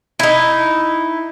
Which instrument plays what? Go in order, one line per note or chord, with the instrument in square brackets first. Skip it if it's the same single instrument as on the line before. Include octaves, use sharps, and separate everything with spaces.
[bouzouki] D#4 E4